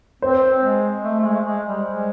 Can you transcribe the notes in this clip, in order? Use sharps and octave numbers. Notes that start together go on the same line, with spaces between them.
C4 C5
G#3
A3
A3
G#3
G#3
G3
G#3